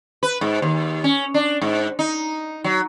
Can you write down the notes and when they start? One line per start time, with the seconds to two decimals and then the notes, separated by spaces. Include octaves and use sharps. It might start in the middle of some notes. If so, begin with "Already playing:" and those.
0.23 B4
0.41 G#2
0.62 D#2
1.04 C#4
1.34 D4
1.62 G#2
1.99 D#4
2.64 F#3